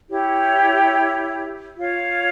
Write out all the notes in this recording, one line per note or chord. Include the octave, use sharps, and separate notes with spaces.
E4 G4 C#5
F4 C#5 F5